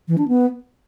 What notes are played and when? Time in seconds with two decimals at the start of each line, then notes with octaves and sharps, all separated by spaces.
0.08 E3
0.18 D4
0.28 B3